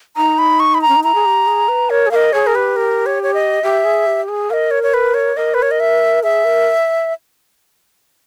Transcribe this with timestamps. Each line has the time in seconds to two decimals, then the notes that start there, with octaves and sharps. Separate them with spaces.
0.16 D#4 A#5
0.38 B5
0.60 C#6
0.74 B5
0.82 A#5
0.88 C#4
0.96 D#4
1.04 E4 A#5
1.15 G#4
1.26 G4
1.47 G#4
1.68 B4
1.90 A#4 C#5
2.07 G#4
2.11 A#4 D#5 F5
2.33 G#4 C#5
2.47 A#4
2.55 G4 B4
2.76 A#4
3.06 C#5
3.23 C#5
3.34 D#5
3.63 G4 E5
3.85 G#4
4.06 G4
4.29 G#4
4.50 A#4 D#5 F5
4.71 C#5
4.83 C#5
4.94 B4
5.14 C#5
5.36 A#4 D#5
5.54 B4
5.62 C#5
5.71 D#5
5.80 E5
6.23 G#4 E5
6.45 A#4